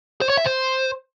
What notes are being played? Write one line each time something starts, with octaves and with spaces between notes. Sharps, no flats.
C5
C#5
E5
C5